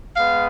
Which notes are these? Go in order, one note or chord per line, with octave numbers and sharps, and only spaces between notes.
G#3 B3 F5